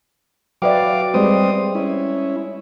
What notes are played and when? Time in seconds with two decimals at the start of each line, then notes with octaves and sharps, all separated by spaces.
0.62 F#3 F#4 B4 D5 E5 F5 G5 D6
1.14 G3 G#3 C4 B4 C5 D#6
1.75 C#4 E4